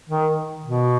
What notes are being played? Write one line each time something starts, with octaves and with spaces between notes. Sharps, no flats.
D#3
B2